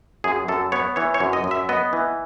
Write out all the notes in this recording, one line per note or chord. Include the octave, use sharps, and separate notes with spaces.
F#2 G#4
F#2 A4
B3 C#5
E3 C#5
C#5
F#2
D#5
F#2
E5
B3 D#5
E3